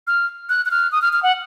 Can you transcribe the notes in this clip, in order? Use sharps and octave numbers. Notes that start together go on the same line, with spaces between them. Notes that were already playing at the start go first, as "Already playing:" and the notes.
F6
F#6
F#6
F6
D#6
F6
F6
F#5